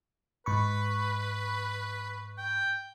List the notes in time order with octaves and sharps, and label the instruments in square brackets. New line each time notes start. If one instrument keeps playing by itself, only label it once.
[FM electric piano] G#2 B5 C#6 [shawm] B4
[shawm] G5